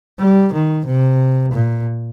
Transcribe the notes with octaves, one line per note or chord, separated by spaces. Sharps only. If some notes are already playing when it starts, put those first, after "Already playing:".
G3
D#3
C3
A#2